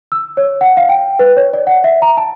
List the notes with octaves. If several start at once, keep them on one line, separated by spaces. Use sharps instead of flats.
E6
C#5
F#5
F5
G5
B4
C#5
D5
F#5
E5
A#5
A5